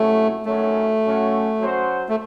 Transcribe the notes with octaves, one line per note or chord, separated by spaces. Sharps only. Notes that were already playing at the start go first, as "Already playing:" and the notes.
Already playing: C3 F#3 A3 C#4 E4
F#2 D#3 F#3 A3 C#4
A2 F#3 C#4 F#4
F#3 C#4 F#4 C5
A3